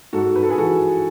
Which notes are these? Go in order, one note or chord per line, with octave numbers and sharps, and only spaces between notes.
G#2 F#4 A4
G#2 B4
A4
G#4 B4
E3 F#4 A4